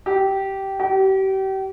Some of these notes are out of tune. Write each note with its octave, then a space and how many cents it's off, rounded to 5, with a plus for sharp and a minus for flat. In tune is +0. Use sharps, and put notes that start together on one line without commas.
G4 -15
G4 -35